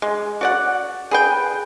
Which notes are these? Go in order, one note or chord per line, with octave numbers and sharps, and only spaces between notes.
G#3
F#4 D5 F#5
G#4 B4 G5